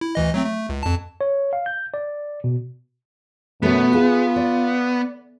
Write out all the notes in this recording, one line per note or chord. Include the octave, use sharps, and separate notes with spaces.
E4
D2 E3 D#5
F#3 A3 C4
A3
C#2
F2 A5
C#5
F5
G6
D5
B2
F#2 B2 A3 B3
F4 G#4
D5